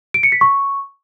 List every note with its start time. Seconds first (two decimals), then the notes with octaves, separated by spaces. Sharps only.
0.14 D7
0.23 C#7
0.32 B6
0.41 C#6